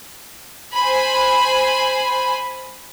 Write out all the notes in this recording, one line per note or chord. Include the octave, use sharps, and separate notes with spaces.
C5 G#5 B5